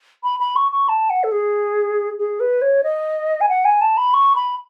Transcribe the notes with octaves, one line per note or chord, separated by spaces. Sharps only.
B5
B5
C#6
C#6
A5
F#5
A4
G#4
G#4
B4
C#5
D#5
G#5
F#5
G#5
A5
B5
C#6
B5